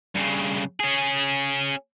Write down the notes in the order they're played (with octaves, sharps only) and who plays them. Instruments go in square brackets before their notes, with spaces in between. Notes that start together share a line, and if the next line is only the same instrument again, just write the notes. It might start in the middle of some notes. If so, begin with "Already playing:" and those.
[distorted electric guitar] G2 C#3
C#4 G#4